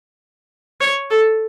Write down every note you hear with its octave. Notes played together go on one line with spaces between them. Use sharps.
C#5
A4